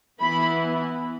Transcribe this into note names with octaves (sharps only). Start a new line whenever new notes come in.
E3 B3 E4 B5